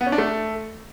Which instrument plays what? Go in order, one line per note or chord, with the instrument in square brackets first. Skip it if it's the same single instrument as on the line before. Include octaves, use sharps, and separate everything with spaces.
[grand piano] B3
C#4
D4
A3